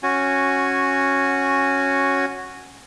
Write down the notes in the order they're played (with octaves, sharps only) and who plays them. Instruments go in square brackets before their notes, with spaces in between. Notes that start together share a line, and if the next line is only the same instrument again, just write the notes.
[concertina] C#4 F#4 G#5